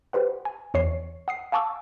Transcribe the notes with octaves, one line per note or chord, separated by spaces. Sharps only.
G4 B4 C5 F#5
G#5
E2 C#5 C7
F#5 D#6 C7
F5 G#5 A5 C#6 D6 E6